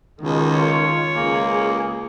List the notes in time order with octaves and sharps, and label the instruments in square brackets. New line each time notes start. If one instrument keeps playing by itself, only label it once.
[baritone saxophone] C#2 [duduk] B2 [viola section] D#3
[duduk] F4 [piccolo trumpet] C#5
[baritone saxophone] C#2 [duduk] A#3 [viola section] G#4